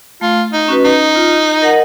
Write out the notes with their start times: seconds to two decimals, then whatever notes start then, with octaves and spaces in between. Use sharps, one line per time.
0.21 A3 F4
0.53 D#4
0.68 C#4 F#4 B4
0.84 D#4
1.16 F4
1.62 A#4 D#5 F#5